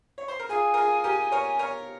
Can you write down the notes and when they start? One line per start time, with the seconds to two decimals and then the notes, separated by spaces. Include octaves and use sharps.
0.18 C#5
0.28 C5
0.39 A#4
0.49 F4 G#4 G#5
0.74 A#4
0.77 F4 G#4
1.04 G4 A#4
1.32 A#4 C#5
1.59 A#4 C#5